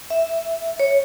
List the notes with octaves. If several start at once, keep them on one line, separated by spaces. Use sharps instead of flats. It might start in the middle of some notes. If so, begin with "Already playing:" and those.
E5
C#5